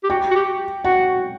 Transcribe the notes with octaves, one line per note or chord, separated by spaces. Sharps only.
G4
F#4 G5
F#4
G4
F#4 F#5